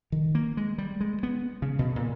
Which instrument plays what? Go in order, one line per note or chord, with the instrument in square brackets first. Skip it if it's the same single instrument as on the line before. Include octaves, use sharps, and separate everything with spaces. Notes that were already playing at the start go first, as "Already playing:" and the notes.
[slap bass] D#3
A#3
G#3
G3
G#3
B3
C#3
B2
A#2